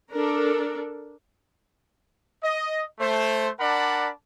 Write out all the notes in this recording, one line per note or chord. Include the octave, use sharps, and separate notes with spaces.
D4 A4 A#4
D#5
A3 C5
D4 A#4 D5 F#5 A5 B5